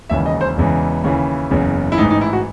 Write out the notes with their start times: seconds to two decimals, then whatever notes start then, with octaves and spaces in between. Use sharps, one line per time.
0.10 E1 D#2 C#3 E3 E5
0.26 D#5
0.41 C5
0.57 E1 E2 C#3 E3
1.04 D#2 C#3 E3
1.51 F#1 E2 C#3
1.92 E4
1.98 A1 G#2 E3 D#4
2.10 D#4
2.21 E4
2.33 F#4